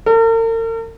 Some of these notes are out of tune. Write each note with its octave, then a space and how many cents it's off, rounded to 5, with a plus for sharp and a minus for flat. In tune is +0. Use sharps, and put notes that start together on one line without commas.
A#4 -45